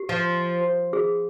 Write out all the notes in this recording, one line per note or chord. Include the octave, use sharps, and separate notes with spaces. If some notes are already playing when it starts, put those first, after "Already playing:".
Already playing: G4
F3
G#4